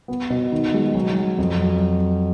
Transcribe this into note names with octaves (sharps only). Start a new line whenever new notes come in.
B3
B2
D#3
G#3
F#3
F#3
F2
F#3